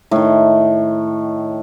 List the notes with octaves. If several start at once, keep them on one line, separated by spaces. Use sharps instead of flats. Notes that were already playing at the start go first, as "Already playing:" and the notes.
A2 D#3